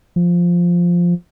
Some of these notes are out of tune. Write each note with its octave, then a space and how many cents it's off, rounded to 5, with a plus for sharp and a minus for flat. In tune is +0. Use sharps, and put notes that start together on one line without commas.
F3 +0